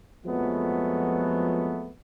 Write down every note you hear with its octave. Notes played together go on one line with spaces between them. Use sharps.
F2 F3 F#3 G#3 A3 B3